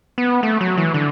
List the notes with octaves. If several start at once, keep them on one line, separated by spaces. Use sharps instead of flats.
B3
A3
F#3
E3
D3